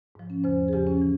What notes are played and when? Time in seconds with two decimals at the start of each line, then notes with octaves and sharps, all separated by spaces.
0.15 G#2 F3
0.30 C#4
0.44 E2 C#3 F3 C5
0.68 G#4
0.73 E2 C#3 F3 G4
0.87 C#4
1.02 E3